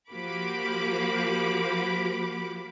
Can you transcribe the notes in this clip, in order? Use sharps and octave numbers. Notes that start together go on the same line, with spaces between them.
F3 A#3 F#4 G4 B5 D6